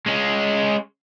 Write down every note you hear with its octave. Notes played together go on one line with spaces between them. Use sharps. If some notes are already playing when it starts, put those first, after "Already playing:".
G#3 C#4